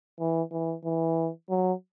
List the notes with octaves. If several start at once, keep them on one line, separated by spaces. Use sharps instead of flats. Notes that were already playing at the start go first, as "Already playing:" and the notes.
E3
E3
E3
F#3